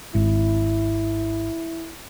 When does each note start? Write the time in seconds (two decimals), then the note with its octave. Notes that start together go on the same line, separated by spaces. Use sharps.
0.15 G#1 E4